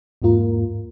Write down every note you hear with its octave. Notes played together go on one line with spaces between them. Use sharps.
E2 G#2 A#3 F4 A#4